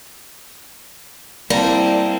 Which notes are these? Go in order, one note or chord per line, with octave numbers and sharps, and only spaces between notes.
G3 A#3 C4 E4 A5 A#5